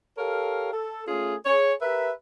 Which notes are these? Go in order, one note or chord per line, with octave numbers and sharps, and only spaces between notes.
G4 A4 A#4 C#5 F5
A4
A3 C#4 F4 G#4
G#4 C#5
G4 A#4 B4 E5